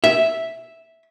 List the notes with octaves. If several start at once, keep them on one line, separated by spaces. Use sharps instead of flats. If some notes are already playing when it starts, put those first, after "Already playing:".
E5